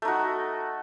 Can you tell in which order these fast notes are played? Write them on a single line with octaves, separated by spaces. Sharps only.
A3 D#4 F#4